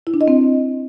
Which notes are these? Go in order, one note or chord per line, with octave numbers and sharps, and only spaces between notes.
E4
D4
D#5
C4